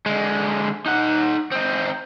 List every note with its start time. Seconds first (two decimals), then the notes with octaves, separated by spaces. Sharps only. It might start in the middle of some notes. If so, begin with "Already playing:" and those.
0.06 D3 G#3
0.86 D#4 F#5
1.51 C4 D#4